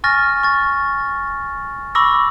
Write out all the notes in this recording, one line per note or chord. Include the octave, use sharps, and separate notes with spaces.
G#5 C#6 F6 A6 A#6
C#6 A6
B5 C#6 D6 E6 A#6